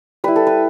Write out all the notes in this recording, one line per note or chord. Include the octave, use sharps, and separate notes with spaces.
G3 E4 B4
A4
B4